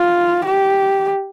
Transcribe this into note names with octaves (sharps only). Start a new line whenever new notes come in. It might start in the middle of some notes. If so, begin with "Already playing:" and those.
Already playing: F4
G4